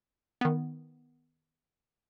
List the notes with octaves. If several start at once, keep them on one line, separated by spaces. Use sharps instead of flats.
D#3 B3